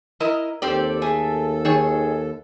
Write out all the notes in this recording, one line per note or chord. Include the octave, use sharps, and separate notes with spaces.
E4 A#4 D#5
D#2 C4 G4 A4 D5
A3 G#4
D#3 G#4 C#5